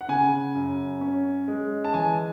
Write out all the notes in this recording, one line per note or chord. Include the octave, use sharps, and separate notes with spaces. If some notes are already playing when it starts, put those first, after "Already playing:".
F#5
C#3 G#5
F#2
C#4
G#3
A5
E3 G#5